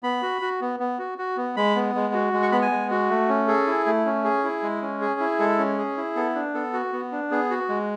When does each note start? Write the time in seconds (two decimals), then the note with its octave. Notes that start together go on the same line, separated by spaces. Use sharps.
0.03 B3 B5
0.22 F#4
0.42 F#4
0.61 B3
0.80 B3
0.99 F#4
1.18 F#4
1.37 B3
1.57 G#3 B5
1.76 B3
1.95 G#3
2.14 F#4
2.33 G#3
2.42 C#6
2.52 B3 B5
2.62 G#5
2.71 G#3
2.91 F#4
3.10 A3
3.29 C#4
3.48 G#4 A4
3.67 E4
3.86 A3
4.05 C#4
4.25 G#4
4.44 E4
4.63 G#3
4.82 C#4
5.01 G#4
5.20 E4
5.39 G#3 A4
5.58 C#4
5.78 G#4
5.97 E4
6.16 B3 A4
6.35 D4
6.54 B3 A4
6.73 F#4
6.92 B3
7.12 D4
7.31 B3 G#4
7.50 F#4
7.69 G#3